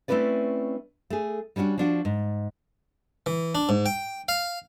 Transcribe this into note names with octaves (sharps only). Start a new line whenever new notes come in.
A3 C4 C#4 E4 B4 D5
A3 G#4
G3 C#4 D4 E4 F#4
F3 D4 F#4
G#2
E3
D4
G#2
G5
F5